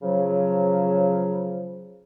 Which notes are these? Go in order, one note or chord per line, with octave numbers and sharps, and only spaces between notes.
C#3 F3 F#3